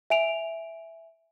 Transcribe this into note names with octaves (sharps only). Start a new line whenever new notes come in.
E5 G#5 D7 F7